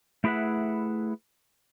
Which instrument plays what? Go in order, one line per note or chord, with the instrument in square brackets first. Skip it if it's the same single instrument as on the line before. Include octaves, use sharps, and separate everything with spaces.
[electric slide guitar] A3 E4 G#4 B4 E5 F#5